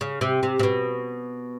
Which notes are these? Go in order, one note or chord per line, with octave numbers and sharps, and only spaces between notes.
C#3
C3
C3
C3
B2